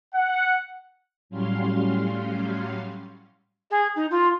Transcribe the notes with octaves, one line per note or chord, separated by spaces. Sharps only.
F#5
A2 F#3 G3 C#4 F5 C6
G#4
D#4
F4